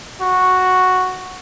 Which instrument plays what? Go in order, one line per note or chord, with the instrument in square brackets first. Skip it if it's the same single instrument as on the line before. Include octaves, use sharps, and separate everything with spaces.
[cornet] F#4